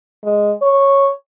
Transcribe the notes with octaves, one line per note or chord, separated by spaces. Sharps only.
G#3
C#5